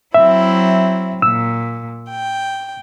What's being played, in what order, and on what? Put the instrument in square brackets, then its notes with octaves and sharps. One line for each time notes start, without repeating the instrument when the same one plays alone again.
[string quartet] F#3 C4 E4 [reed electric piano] E5
[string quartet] A#2 [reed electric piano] E6
[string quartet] G5